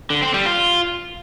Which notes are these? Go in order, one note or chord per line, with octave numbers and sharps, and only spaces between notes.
D3
C4
G3
F4